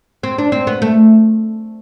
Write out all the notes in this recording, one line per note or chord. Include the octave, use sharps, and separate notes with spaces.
C4
D4
C4
B3
A3